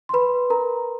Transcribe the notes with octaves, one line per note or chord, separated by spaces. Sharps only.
C6
B4 B5
A#4 A#5